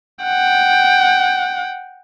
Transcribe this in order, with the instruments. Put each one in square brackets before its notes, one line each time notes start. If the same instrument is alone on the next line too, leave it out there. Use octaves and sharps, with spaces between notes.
[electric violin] F#5 G5